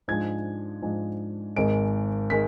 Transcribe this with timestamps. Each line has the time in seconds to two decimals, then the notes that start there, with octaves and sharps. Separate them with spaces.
0.08 G#2 F3 G#3 D4 G#6
0.82 G#2 F3 G#3 D4
1.56 G#1 G#2 D#3 G#3 D7
2.30 D#3 G#3 B6